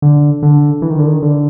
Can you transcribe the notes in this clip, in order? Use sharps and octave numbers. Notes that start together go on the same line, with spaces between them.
D3
D3
E3
D#3
D3
D#3
D3